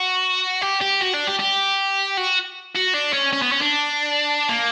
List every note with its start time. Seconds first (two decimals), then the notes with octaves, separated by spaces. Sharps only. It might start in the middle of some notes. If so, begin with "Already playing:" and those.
Already playing: F#4
0.62 G4
0.81 G4
1.01 F#4
1.14 D4
1.27 G4
1.39 G4
2.17 F#4
2.75 F#4
2.94 D4
3.13 C#4
3.33 C#4
3.42 B3
3.52 C#4
3.61 D4
4.49 A#3